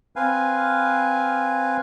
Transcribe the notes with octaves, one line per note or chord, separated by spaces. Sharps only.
C4 B4 F5 G#5